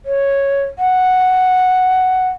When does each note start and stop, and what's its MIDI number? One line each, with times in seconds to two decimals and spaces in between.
0.05 0.64 73
0.79 2.28 78